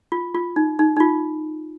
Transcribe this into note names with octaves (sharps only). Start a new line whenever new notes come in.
F4
F4
D#4
D#4
D#4
F4